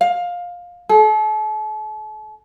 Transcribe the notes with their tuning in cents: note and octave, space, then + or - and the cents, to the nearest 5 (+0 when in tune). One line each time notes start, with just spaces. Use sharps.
F5 +15
A4 -40